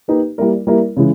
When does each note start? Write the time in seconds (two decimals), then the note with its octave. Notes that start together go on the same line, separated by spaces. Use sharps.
0.08 A#3 D#4 G4 B4
0.38 G3 A#3 E4 A#4
0.67 G3 A#3 E4 A#4
0.96 C#3 E3 G#3